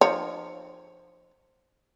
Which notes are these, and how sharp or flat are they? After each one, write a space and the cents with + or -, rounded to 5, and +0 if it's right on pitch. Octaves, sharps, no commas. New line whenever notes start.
F3 +5 D#4 -45 C#5 +0